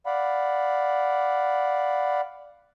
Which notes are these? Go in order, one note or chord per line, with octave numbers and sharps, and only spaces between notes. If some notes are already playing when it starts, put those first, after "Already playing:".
D5 F5 F#5 B5